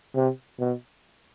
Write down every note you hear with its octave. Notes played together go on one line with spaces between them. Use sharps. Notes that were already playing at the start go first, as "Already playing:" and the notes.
C3
B2